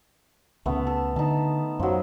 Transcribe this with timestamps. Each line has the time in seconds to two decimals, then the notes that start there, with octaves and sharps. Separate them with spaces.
0.66 C#2 C#3 A3 B3
0.87 A4
1.16 D3 D#4 A5
1.79 F#2 F3 F#3